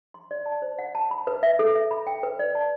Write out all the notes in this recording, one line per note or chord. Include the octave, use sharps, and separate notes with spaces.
C6
D5
A5
C5
F#5
A5
B5
B4
E5
A4
E5
B5
G5
B4
D5
A5